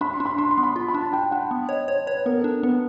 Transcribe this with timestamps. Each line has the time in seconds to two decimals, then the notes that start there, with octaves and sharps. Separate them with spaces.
0.01 D4 B5
0.14 C6
0.20 D4
0.26 B5
0.38 D4 C6
0.51 C6
0.58 B3
0.63 B5
0.76 F4 C6
0.88 B5
0.94 D4
1.01 A5
1.13 D4 G5
1.31 D4 F#5
1.51 B3
1.69 C#5 D#5
1.88 C5 C#5
2.06 B4 C#5
2.26 B3 A#4
2.38 A4
2.44 D4
2.63 B3 B4